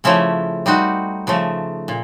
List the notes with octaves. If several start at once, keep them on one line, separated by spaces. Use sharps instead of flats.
C#3 F3 A3 C#4 E4
G3 C4 D#4 F#4
C#3 F3 A3
A#2